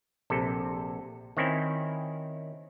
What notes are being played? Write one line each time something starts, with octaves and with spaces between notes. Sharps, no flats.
A#1 C3 A4
D#3 C4 C#4 E4